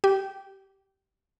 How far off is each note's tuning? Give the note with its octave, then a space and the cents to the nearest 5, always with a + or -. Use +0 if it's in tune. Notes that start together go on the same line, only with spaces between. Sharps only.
G4 -20 G5 +0